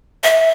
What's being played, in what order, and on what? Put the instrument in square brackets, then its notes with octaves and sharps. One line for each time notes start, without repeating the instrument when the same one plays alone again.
[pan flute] E5